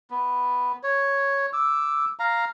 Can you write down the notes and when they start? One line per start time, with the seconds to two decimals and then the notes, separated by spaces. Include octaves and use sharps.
0.10 B3
0.83 C#5
1.53 D6 E6
2.19 F5 A#5